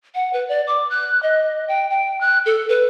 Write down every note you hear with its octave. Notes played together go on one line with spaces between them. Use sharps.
F#5
B4
D5
D6
F#6
D#5
G5
G5
F#6
A4
B4